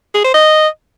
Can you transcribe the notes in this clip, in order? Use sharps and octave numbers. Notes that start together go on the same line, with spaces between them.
G#4
C5
D#5